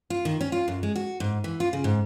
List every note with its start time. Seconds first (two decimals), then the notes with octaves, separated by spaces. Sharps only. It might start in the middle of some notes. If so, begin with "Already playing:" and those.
0.10 F4
0.25 D#3
0.41 C#4
0.52 F4
0.68 F#2
0.83 G#3
0.96 F#4
1.20 G#2
1.44 E3
1.60 F4
1.73 C#3
1.84 G#2